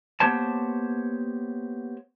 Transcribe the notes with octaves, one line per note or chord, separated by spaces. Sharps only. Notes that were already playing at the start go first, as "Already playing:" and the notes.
A#3 B3 G4 C5 C#5 A5